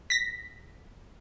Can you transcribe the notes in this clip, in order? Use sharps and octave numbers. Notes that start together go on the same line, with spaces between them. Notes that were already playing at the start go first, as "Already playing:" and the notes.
A#6 B6